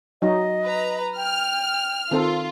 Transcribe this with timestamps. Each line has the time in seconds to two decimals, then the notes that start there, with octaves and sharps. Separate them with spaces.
0.22 F#3 D#4 F#4 D#5
0.65 B4 A#5
1.16 G5 F6
2.11 D#3 C4 F4 A4